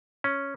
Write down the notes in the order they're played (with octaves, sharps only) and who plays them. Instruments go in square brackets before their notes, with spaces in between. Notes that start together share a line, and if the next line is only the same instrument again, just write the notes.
[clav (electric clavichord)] C#4